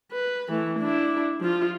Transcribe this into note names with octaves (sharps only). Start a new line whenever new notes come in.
B4
E3 A3
D4 E4
F3 F4